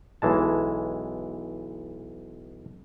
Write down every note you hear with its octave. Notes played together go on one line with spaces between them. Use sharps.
B1 E3 G#3 A5